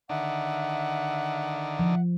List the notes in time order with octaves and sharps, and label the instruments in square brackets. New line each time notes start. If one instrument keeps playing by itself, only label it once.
[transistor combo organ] D3 D#3 [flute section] E5 F#5
[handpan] F3